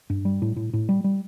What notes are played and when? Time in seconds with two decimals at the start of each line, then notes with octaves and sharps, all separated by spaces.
0.10 G2
0.25 G3
0.42 A2
0.56 A2
0.73 A2
0.89 G3
1.04 G3